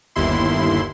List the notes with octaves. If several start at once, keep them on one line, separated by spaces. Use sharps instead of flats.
G1 D#2 E4 C6